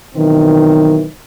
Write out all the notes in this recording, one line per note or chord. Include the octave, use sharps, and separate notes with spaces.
B2 D#3 E3 F#3 C4